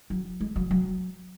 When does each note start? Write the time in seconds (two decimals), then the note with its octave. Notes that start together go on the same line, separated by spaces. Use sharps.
0.10 F#3
0.41 G#3
0.56 F#3
0.71 F#3